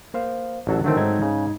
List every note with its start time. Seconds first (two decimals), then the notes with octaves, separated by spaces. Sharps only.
0.14 A#3 C5 F5
0.67 A1 F#3 A4
0.84 D3 D#3 F#3 A3 C4
0.97 G#2 D#4 G#6
1.22 C#3